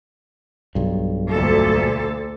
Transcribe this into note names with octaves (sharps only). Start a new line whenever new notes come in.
B1 G2
D2 A#2 A4